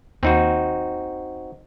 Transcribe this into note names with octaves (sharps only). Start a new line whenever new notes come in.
D#2 C4 D#4 F#4